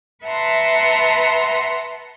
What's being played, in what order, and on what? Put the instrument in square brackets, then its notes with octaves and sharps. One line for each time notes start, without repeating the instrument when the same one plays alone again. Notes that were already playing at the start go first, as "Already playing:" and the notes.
[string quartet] B4 E5 F#5 A5 A#5 C6